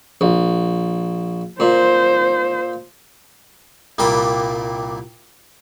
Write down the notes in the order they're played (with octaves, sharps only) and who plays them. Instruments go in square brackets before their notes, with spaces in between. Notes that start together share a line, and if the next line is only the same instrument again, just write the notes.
[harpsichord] A#1
[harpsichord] A#2 [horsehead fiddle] C5
[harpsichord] C2 A#2 G3 A#3 B5 D6